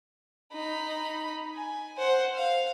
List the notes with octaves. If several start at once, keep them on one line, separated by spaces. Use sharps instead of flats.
D#4 B5
G#5
C5 F#5
F5